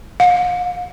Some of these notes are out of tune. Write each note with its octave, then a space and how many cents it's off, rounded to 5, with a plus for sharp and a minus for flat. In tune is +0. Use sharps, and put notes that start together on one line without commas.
F5 +40